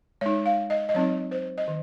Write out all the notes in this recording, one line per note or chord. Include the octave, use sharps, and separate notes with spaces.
G#3 D#4 C#5
F5
D#5
D#5
F#3 C4 D#4 C#5
C5
D#5
D#3